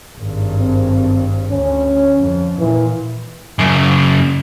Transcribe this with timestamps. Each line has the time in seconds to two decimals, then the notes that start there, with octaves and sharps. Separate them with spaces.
0.17 G#1 G2
0.60 C4
1.51 D2 C#4
2.18 F2
2.59 A#2 E3
3.59 F#2 C#3